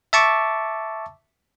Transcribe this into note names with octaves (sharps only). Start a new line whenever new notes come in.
E5 A5 C#6 D6